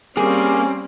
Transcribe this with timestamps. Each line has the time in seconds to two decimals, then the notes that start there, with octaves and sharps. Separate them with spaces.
0.17 G3 A#3 C4 C#4 G#4